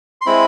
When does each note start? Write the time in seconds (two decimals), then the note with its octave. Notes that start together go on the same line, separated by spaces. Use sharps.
0.21 C6
0.26 G#3 C4 E4 B5